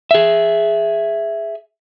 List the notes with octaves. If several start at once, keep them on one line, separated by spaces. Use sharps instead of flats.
G#4 E5